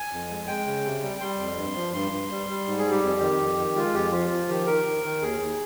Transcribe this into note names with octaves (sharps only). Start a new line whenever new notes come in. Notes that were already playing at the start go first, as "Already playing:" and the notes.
Already playing: G#5
F2
G#3
G#3 G5
C#3
C3
G3
G3 C6
F2
G2
F3
G2 C6
G2
G3
G3
G#2
G#4
G3
G4
F2
D#3
F2
D#3
G#3 F4
F2 G4
F3 F4
F3
D#3 G4
D#3 A#4
D#3
D#3
D#2 G#4
D#2